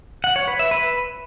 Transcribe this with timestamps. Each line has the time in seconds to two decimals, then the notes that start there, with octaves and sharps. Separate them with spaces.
0.24 F#5
0.36 C#5
0.48 B4
0.59 E5
0.71 B4